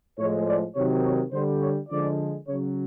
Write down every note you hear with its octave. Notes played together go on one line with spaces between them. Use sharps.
A2 F3 G#3 C#5
D5
C3 D#3 F#3 C#5
C#5
D3 G3 C5
C#5
D3 F3 G#3 D5
C#3 F#3 C#5